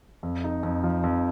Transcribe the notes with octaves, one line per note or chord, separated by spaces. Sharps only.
F2
D#4
F2
F3
F2